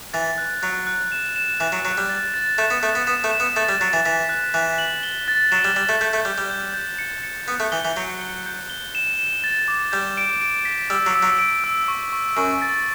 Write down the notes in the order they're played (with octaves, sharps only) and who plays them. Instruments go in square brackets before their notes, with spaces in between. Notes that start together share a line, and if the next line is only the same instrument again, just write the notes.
[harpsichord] E3 [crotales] A6
[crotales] F#6
[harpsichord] F#3 [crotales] F#6
[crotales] F#6
E7
E7
[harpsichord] E3 [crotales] F#6
[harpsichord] F#3
[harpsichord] F#3 [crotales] F#6
[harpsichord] G3
[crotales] A6
A6
[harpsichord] A3 [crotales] E7
[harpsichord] B3
[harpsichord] A3 [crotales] A6
[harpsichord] B3
[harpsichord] B3 [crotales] E7
[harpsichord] A3
[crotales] E7
[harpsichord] B3
[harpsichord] A3 [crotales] A6
[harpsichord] G3
[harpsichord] F#3 [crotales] A6
[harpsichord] E3
[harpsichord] E3 [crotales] B6
[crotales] F#6
[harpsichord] E3 [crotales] F#6
[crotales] F#7
G7
A6
[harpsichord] F#3 [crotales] E7
[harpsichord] G3
[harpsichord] G3 [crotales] A6
[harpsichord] A3
[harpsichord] A3 [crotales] G6
[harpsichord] A3
[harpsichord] G3 [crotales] G6
[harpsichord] G3
[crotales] G6
G6
C#7
C#7
[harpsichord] B3 [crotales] F#6
[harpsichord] A3
[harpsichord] E3 [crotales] G7
[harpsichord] E3
[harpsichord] F#3 [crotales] G6
[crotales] G7
G6
G7
E7
E7
A6
D6
[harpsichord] G3 [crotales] G6
[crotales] D7
D7
B6
[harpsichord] G3 [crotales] E6
[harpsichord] F#3
[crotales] E6
[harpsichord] F#3
[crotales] D7
E6
C#6
C#6
[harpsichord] F#2 [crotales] C#6
[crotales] A6